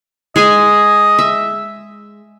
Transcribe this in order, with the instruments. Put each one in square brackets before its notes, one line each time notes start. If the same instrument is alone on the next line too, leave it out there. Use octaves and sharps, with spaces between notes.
[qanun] G#3 G#4 G#5 [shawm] D#5
[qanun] E5